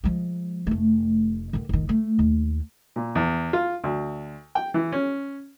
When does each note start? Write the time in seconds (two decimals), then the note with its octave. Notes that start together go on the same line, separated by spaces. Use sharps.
0.04 F3 G#3
0.67 F1 A3
1.53 D3 D#3
1.69 F1 D#3
1.89 A3
2.19 D#2
2.96 A#2
3.15 E2
3.53 F4
3.84 D2
4.55 G5
4.74 E3
4.92 C#4